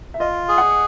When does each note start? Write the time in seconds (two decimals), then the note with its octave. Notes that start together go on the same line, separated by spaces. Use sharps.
0.14 E5
0.20 F4 D#5
0.49 G#4
0.58 F#5